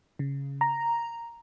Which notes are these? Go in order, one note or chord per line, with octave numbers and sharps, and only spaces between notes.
C#3
A#5